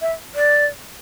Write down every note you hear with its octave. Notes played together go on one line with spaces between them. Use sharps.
E5
D5